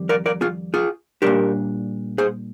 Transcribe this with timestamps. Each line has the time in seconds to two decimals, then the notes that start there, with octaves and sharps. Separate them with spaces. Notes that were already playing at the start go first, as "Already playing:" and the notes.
Already playing: F2 D#3 G3
0.09 A#4 D5
0.26 A#4 D5
0.41 F4 G#4
0.74 F4 G#4
1.22 A#2 G3 D4 G4 A#4
2.18 G#4 C5